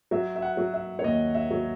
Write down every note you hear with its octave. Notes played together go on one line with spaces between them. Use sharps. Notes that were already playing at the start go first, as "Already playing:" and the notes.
F#3 E5
E5
F#5
F#3
E5
C#5
D#2 D#5
E5
F#3